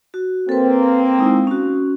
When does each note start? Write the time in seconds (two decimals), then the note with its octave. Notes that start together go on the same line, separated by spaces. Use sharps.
0.14 F#4
0.49 A#3 C4 A4 B4
1.18 G#3 D#4 E4
1.47 C#4 F#4